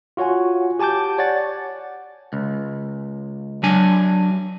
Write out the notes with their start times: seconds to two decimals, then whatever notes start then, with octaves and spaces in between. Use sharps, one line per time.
0.17 F4 F#4 C#5 F#5 G#5
0.79 G4 G#5 A5 D6 G6
1.18 C#5 D5 F#5 A6
2.33 C#2
3.63 F#3 D4 G#5